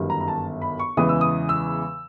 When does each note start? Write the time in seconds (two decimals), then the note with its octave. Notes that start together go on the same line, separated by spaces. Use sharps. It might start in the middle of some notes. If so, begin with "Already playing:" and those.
Already playing: G1 F#2 D#3 G3
0.10 A#5
0.21 A#5
0.28 A5
0.62 B5
0.80 C#6
0.97 E2 C#3 E3 G#3 D#6
1.09 E6
1.21 D#6
1.49 E6